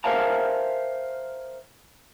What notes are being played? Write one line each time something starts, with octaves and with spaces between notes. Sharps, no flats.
A#4 C5 E5 F5 A5 A#5